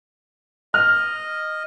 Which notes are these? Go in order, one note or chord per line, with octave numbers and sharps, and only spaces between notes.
D#5 F6